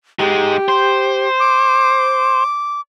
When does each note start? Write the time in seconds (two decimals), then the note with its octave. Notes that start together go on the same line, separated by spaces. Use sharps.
0.19 G#2 G#3 G4
0.68 C5
1.40 D6